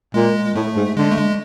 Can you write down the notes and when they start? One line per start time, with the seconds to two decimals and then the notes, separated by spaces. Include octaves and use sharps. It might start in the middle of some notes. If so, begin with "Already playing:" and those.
0.14 A#2 G#3
0.55 A2 A3
0.76 G#2
0.97 D3 G#3
1.11 A3
1.17 G#3